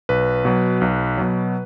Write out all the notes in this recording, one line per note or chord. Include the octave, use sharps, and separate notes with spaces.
B1 B4
B2 F#3
B1
B2 F#3